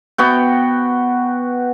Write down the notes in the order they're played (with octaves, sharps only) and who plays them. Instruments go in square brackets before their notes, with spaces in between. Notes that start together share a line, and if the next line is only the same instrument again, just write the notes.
[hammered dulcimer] B3 F#4 G5